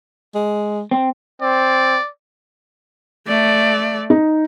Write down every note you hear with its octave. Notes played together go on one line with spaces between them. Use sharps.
G#3
C4
C4 D5
A3 D5
D#4